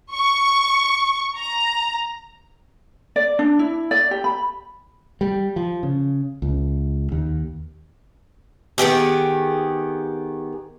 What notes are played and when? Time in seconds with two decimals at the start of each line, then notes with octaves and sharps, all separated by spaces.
0.14 C#6
1.37 A#5
3.16 D5
3.39 D4
3.59 E4
3.91 D5
4.11 G4
4.24 B5
5.21 G3
5.56 F3
5.83 C#3
6.42 C#2
7.12 D#2
8.78 D#3 B3 G4 G#4